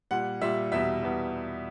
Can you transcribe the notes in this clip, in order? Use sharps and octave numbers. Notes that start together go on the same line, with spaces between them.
A#2 G3 F#5
A#2 G3 E5
E2 B2 G3 E5
E2 B2 G3